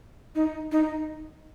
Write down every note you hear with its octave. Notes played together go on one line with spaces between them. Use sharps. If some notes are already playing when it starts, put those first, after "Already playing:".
D#4
D#4